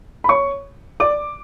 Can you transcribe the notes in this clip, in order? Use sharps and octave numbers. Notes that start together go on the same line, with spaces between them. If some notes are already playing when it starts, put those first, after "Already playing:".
B5
C#5 C#6
D5 D6